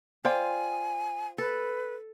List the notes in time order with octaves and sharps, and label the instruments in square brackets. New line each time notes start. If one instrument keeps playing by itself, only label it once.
[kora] F4 [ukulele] C5 D5 G5 [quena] G#5
[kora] A4 [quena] B4